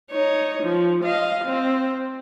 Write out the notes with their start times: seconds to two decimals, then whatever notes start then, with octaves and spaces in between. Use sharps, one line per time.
0.11 D#4 C#5
0.63 F3
1.04 D#5 F5
1.45 C4